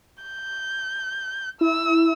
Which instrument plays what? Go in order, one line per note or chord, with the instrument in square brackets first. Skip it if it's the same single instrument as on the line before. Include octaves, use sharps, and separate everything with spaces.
[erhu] G6
[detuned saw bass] E4 [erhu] E6